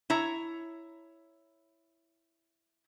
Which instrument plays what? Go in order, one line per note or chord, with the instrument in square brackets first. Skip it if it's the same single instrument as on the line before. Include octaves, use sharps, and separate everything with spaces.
[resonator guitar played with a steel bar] E4 C#5 A#5